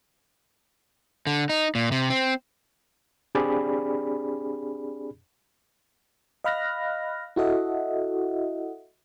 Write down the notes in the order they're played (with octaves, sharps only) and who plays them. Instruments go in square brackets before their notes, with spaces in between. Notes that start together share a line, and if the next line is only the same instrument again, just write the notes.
[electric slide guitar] D3
D#4
A#2
C3
C4
[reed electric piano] C4 D4 G4 G#4 D5 B5
[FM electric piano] D#5 F5 B5 F6 F#6 A#6
E4 F#4 A4 D#5 E5 F#5